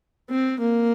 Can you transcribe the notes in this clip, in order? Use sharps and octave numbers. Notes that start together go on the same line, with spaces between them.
C4
A#3